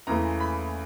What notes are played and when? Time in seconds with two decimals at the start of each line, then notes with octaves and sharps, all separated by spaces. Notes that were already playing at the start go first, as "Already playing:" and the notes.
0.07 E2 C#3 E3 A3 A#5
0.40 B5